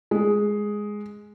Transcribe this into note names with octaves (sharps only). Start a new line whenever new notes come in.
G#3